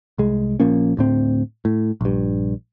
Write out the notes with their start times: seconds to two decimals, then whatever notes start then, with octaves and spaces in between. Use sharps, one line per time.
0.18 C2 G#3
0.60 A#1 F3 A#3 C#4
0.97 D2 A2 C4
1.65 A2
2.01 A#1 G2